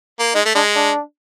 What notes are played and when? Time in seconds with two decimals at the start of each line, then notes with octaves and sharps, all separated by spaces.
0.19 A#3
0.34 G#3 D#4
0.45 A3
0.55 G#3 D4
0.75 D4